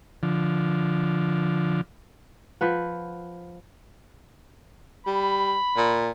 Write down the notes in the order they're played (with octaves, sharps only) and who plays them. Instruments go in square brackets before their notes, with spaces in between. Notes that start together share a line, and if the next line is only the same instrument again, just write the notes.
[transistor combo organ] D3 F3
[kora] F3 B4 F#5
[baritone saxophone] G3 [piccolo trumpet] B5
[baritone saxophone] A#2